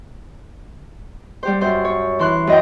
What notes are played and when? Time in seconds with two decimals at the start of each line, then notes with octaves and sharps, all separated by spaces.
1.43 G3 G4 C5
1.61 F#2 C5
1.85 C#5
2.19 E3 C6 F#6
2.47 F#2 D#5 G5